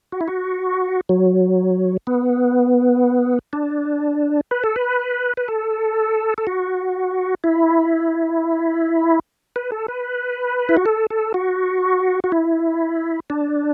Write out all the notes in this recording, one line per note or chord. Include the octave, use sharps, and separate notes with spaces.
F#4
E4
F#4
F#3
B3
D4
B4
A4
B4
B4
A4
A4
F#4
E4
B4
A4
B4
E4
F#4
A4
A4
F#4
F#4
E4
D4